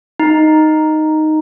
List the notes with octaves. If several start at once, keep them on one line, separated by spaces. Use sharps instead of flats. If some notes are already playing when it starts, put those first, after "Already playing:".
D#4